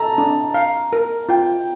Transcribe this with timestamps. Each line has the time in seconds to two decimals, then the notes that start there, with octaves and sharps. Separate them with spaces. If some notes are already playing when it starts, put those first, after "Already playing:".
Already playing: A4 A5 A#5
0.18 D4
0.54 F5
0.93 A#4
1.29 F4 G5